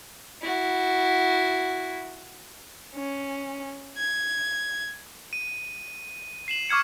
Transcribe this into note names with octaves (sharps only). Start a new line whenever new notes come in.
E4 F#4
C#4
G#6
D#7
C7 E7 F#7
C#6 D6 F6 G#6 C#7